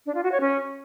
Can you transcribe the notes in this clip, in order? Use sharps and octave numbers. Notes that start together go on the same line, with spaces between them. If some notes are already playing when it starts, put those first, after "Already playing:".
D4
F4
F#4
C#5
C#4